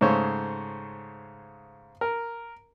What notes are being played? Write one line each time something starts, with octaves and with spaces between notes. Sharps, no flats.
G#2 C#3 A3 C5 C#5
A#4